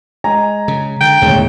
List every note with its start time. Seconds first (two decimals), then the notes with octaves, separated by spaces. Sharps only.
0.24 G#3 G#5 A#5
0.68 C#3
1.01 D3 G5
1.22 E1 A1 D#2 D3 D#3